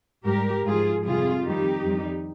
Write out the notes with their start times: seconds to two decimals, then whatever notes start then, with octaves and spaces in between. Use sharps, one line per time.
0.24 G#2 G3 G4 A#4
0.65 G#2 F3 F4 G#4
1.05 F2 C3 G3 F4 G#4
1.45 F2 D#3 G3 D#4 G4
1.85 F2 D#3 G3